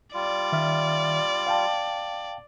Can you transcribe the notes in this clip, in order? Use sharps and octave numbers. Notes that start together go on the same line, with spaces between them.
G3 F4 D5
D#3 E5 F6
F5 G5 A5